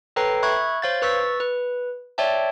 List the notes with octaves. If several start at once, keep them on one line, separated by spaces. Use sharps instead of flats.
A4 B4 C#5 G5 A#5 C7
E5 B5 C#6 F#6 G#6
C5 C#5 F5 G6 A6
B4 C#6 E6 A6 B6
B4
C#5 D5 E5 G5 A5